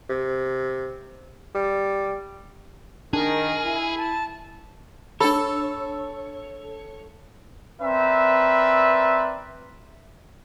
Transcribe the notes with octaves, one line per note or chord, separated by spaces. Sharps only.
C3
G3
D#3 D4 G#4 A#4
E4
A5
D4 A4 C#5 B5
C4 A#4 B4 D5 E5